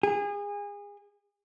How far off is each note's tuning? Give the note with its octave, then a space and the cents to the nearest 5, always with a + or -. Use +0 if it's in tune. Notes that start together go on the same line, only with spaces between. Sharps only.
G#4 -30